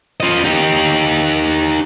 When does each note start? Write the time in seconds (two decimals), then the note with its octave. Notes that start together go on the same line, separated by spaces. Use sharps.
0.20 F4 D#5
0.44 D#4 G4